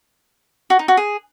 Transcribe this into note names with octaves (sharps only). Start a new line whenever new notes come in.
F#4
D#4
F#4
G#4